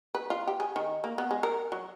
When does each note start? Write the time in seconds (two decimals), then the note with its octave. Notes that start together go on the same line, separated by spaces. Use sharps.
0.15 B4
0.30 F4
0.47 G4
0.60 G#4
0.76 D#3
1.04 A#3
1.18 B3
1.31 G#3
1.43 A#4
1.72 F#3